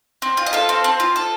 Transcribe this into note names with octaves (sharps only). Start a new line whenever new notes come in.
C4
F4
D#5
A4 F5
C4
C4
F4
A4